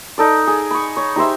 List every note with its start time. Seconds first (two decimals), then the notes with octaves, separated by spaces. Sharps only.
0.18 D#4 A4 D5
0.47 G#4
0.71 B5 C#6
0.97 C#5
1.16 D#4 G4 C5 E5